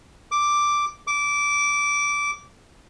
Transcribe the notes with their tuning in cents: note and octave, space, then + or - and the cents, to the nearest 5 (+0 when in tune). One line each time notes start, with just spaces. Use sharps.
D6 +0
D6 -15